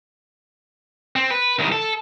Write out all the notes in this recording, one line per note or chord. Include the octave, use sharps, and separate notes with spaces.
C4
B4
C2 D#3
A4